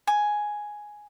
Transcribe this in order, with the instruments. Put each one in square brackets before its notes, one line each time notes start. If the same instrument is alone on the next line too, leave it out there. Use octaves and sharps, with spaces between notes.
[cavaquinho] G#5